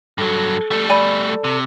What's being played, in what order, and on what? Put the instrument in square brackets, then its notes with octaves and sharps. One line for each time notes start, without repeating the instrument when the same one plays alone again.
[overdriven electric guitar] G2 F#3 [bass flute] A4
[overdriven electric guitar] G3 A3 [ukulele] A5
[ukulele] D5 G#5 B5
[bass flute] A4
[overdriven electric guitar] C3